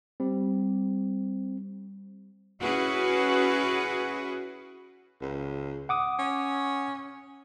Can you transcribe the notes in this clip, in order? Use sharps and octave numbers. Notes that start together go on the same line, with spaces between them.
G3 C4
C#4 E4 F#4 G#4 B4
C#2
F#5 D6 D#6
C#4